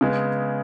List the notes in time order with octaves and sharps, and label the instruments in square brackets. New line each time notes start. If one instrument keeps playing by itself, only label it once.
[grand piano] C#3 G#3 B3